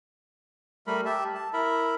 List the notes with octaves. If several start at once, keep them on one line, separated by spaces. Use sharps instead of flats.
G3 A3 A#4 B5
G4 E5 A5
A5
E4 A#4 E5 B5